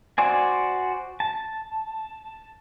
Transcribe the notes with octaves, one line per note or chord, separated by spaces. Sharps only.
F#4 C5 D5 G#5
A5